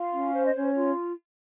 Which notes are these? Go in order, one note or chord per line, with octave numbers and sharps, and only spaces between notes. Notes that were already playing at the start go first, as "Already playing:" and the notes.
Already playing: F4 F5
C#4
C5
D#5
C#4 C#5
F4